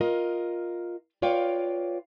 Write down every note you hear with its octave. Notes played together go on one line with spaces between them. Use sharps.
F4 A#4 D#5
F4 B4 C#5 D5 F5 G5